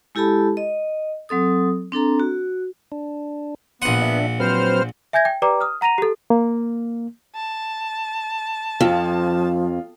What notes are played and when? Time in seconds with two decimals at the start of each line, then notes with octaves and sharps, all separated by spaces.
0.15 G#3 E4 G4 A4 A5 B5
0.57 D#5
1.29 F#3 C4 A4 D#6
1.92 C4 D4 A4 A#5
2.20 F#4
2.92 D4
3.82 A#1 B3 F#5 C6 D#6
4.02 D4 E5
4.40 F#3 C4 B4 C5 F6
5.13 E5 G#5 G6 G#6 A#6
5.25 G5
5.42 G4 B4 D5 G5 A#5 D6
5.61 D#6 F6
5.81 F#5 A#5 A#6 D#7 F7
5.98 G4 A4
6.30 A#3
7.36 A5
8.81 F2 F3 F4